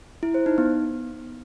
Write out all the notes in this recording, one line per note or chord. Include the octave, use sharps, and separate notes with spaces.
E4
C5
D#4
B3